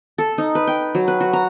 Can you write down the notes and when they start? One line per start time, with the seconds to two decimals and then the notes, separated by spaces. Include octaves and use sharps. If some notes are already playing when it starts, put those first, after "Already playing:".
0.18 A4
0.38 D#4
0.55 B4
0.67 G5
0.95 F#3
1.08 B4
1.21 F#4
1.33 A#5